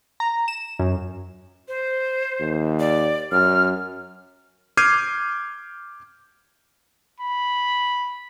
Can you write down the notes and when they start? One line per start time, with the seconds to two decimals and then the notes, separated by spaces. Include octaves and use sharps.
0.20 A#5
0.48 E7
0.79 F#2
1.68 C5
2.40 D#2
2.80 D5
3.32 F#2 F6
4.77 D6 F6 G6 G#6 C7 D#7
7.20 B5